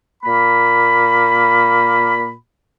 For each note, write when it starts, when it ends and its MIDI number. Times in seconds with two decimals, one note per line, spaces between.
0.23 2.32 46
0.23 2.32 58
0.23 2.32 83